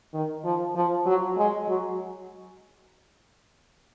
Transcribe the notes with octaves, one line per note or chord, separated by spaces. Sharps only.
D#3
F3
F3
F#3
G#3
F#3